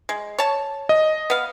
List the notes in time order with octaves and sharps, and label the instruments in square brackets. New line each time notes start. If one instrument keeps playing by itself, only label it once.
[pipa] G#3
C#5 A5
[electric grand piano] D#5
[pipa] B3 F5